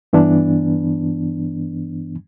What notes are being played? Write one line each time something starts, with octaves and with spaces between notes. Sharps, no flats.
G2 E3 B3 D4